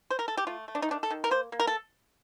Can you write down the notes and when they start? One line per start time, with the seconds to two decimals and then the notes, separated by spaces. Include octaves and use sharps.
0.10 C5
0.19 A#4
0.28 A4
0.37 G4
0.47 A3 F4
0.68 A3
0.75 D4
0.82 D#4
0.89 D#3 D4
1.03 A4
1.10 D#3
1.24 A#4
1.31 A#3 C5
1.52 A#3
1.60 A#4
1.67 A4